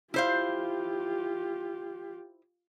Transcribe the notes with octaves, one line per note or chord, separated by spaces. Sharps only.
E4 F4 G4 C5 F5